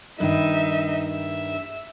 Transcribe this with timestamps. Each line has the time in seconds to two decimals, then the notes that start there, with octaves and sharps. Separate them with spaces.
0.20 G2 D#3 D#4 E5
1.07 E5